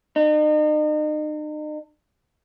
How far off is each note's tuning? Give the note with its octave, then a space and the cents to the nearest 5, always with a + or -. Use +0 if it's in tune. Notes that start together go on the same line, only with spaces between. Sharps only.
D#4 -40